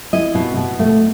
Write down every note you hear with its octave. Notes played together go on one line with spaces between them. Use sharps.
E4 D#5
B2
B2
A3